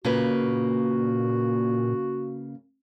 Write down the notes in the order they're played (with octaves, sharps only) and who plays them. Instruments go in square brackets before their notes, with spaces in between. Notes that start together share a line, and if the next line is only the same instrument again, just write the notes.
[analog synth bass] A#2 [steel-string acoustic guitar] C#3 A#3 B4 [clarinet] F#4